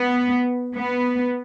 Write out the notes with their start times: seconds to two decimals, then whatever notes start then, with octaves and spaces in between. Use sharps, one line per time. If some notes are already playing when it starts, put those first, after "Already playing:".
Already playing: B3
0.75 B3